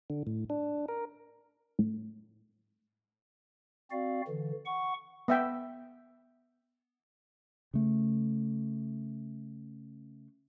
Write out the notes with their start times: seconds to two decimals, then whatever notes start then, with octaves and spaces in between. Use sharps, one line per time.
0.10 D3
0.27 A2
0.50 D4
0.88 A#4
1.79 A2
3.91 C4 F#4 D5 F5
4.28 D3 E3
4.66 F#5 C#6
5.28 B3 E5 G5
7.74 C#3 A3